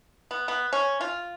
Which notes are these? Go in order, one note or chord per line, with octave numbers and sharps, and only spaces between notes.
B3
B3
C#4
F4